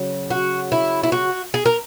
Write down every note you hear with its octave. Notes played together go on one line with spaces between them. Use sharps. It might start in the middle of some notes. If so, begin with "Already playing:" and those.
Already playing: C#3 F#3
F#4
E4
E4
F#4
G#4
A#4